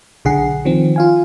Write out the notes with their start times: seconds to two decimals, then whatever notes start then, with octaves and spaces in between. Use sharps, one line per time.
0.25 B1 D3 G#4 F#5 C7
0.65 D#3 F3 C4
0.96 F4 F5 G#5